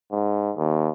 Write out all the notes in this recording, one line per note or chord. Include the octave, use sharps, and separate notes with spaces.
G#2
D#2